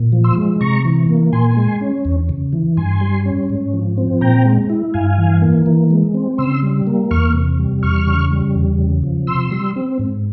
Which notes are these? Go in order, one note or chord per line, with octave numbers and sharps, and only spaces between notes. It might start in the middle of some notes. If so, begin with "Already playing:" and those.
Already playing: A#2
F3
C6 E6
G#3
C3 A#5 C#6
E3
A#3
A#2 G#5 C6
G#3
C#4
E2
C#3
E3
G2 G#5 C6
G3
C#4
G#2
F3
C4
A#2 G5 A#5
G#3
E4
G2 F5 G#5
E3
A#3
E3
G#3
C4
C#3 C6 E6
G3
A#3
E2 C#6 F6
C3
G3
E2 C#6 F6
C#3
G3
E2
C#3
F3
C3 C6 E6
G3
C4
G#2